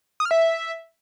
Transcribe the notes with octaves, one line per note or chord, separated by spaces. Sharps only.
D#6
F6
E5